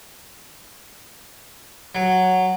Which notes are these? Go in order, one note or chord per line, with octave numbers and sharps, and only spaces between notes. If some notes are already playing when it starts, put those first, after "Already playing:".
F#3